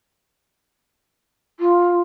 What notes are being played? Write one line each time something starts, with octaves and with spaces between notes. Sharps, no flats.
F4